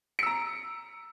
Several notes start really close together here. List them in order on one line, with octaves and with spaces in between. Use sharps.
C#7 E6 A#5